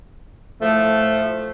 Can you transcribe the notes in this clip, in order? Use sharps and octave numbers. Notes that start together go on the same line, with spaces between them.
A2 F3 A3